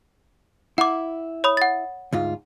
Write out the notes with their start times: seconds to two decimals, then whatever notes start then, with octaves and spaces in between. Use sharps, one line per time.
0.78 E4 F#5 D6
1.44 C#5 B5 D#6
1.57 F#5 A6
2.13 D2 G#2 F4